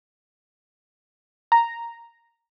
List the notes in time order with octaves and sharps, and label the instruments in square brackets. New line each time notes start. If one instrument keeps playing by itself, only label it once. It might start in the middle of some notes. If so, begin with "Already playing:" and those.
[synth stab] A#5